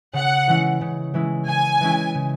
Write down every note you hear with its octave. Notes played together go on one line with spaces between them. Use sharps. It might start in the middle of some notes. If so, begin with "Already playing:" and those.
C#3 F#5
E3 G#3 C#4 E4
C#3
E3 G#3 C#4 E4
C#3 G#5
E3 G#3 C#4 E4
C#3